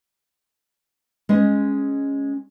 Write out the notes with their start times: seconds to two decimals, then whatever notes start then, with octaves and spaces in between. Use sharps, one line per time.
1.29 G#3 C#4 D#5